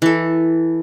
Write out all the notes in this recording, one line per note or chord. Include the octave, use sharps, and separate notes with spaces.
E3 A4